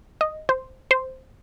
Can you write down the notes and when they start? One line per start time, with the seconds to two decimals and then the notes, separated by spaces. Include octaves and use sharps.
0.21 D#5
0.49 C5
0.91 C5